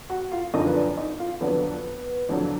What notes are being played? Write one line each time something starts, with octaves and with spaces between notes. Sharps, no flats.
F#4 F#5
F4 F5
F#2 D3 F3 A#3 D4 D#4 D#5
B4
D4 D5
D#4 D#5
F4 F5
F2 D3 F#3 B3 D4 B4
F2 D3 F#3 D4